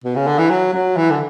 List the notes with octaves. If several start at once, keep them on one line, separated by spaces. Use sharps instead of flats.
B2
C#3
D3
E3
F#3
F#3
E3
D3